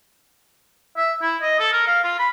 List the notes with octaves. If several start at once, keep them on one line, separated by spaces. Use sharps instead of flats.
E5
E4
D#5
A4
A#4
F5
F4
B5